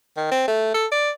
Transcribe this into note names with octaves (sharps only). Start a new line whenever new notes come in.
D#3
C4
A3
A4
D5